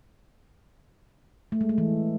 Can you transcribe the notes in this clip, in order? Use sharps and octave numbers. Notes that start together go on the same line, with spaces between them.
A3
G#3
A3
E3